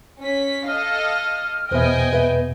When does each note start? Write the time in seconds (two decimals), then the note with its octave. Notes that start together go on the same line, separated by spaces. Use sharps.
0.21 C#4 B6
0.67 A4 D#5 F5 F6
1.71 E2 B2 B3 C5 D#5 E5 G5 G#5
2.12 B4 E5